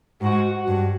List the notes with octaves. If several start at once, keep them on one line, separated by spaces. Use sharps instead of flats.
G#2 F#4
F#4
G2